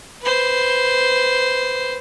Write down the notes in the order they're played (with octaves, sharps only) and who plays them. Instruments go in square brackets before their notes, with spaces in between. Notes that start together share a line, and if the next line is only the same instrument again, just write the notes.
[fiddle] B4 C5